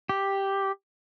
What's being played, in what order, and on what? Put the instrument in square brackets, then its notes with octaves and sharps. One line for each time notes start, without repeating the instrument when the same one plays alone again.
[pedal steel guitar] G4